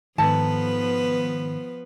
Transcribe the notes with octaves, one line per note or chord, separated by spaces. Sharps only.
G#2 D#3 F3 B3 A4 B4 A5